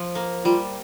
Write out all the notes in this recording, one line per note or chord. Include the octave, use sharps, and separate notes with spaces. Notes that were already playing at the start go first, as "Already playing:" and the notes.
Already playing: F3
A#3
G3 F4